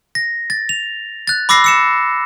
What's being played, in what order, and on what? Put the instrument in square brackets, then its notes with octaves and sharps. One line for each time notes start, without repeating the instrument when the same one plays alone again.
[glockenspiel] A#6
A6
F7
F#6 A6
B5 D6 E6 A#6 C7
E6 C#7 E7